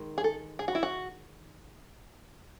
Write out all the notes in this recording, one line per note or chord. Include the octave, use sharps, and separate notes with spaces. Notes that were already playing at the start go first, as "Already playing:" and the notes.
Already playing: D#3 G#3
G#4
A4
G#4
F#4
E4
F#4